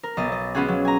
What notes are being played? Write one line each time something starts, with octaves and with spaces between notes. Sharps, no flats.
A#4
B1 B3 D#5 A6
D#5
G#3 B3 C#4 F4 F#4 G#4
F#3
G#5 A#5